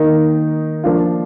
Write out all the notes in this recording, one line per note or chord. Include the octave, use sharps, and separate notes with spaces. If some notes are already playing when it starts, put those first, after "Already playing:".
Already playing: D#3 A#3 D#4
F3 A#3 D4 F4